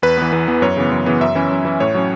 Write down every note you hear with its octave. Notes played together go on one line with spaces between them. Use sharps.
E2 B4
E3 B3
E2 B4
E3 B3
F#2 C#5
C#3 E3 B3
F#2
C#3 E3 B3
F#2 E5
E3 C#4 E4
F#2
E3 C#4 E4
A2 C#5
F#3 C#4